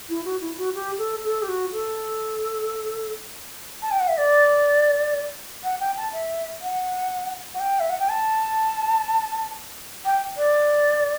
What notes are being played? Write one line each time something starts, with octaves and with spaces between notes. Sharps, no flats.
E4
F#4
E4
F#4
G4
A4
A4
G4
F#4
A4
A5
G5
F#5
E5
D5
F#5
G5
A5
E5
F#5
F#5
G5
E5
F#5
G5
A5
G5
D5